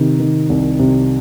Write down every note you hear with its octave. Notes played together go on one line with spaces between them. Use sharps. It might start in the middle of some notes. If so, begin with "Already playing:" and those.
Already playing: C3 D#3
D#3
C2
C3